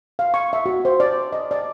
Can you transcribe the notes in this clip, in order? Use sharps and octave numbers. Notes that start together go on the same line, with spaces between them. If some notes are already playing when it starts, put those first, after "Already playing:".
F5
C#6
E5
F#4
C5
D5
D#5
D5